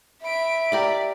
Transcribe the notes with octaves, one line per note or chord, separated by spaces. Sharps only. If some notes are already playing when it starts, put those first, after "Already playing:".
E5 B5 D7
G4 A#4 D5 B5